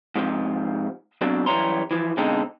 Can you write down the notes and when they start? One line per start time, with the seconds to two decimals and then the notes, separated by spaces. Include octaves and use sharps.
0.16 G#2 C3 F3
1.21 B2 F#3 C4 D4
1.46 F#2 E3 G3 C#5 A#5 C6
1.91 E3 F3
2.17 B2 D3 G#3 C4 D#4 A4